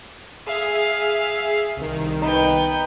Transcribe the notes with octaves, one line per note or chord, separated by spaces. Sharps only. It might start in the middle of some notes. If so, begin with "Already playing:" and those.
G#4 E5 F5
C2 D#3
B3 D#4 G5